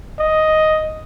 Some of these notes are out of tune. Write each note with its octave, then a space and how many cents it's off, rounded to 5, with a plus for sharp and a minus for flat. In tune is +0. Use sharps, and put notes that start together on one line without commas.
D#5 +5